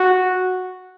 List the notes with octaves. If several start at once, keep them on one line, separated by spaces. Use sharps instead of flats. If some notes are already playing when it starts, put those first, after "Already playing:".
Already playing: F#4